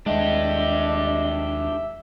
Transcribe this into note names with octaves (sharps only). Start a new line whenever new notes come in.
D#2 G#3 D4 G4 D#5 E5